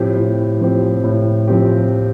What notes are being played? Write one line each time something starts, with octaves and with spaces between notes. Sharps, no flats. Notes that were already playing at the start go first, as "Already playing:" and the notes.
Already playing: A2 F3 C4 G4
A2
F3 C4 G4
A2
F3 C4 G4